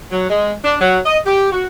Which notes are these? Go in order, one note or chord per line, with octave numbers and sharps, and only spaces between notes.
F#3
G#3
D4
F#3
D#5
G4
F#4